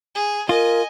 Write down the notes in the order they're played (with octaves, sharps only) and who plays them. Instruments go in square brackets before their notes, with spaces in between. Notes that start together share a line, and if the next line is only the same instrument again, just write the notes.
[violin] G#4
[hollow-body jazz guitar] F4 [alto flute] A#4 [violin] D#5 G#5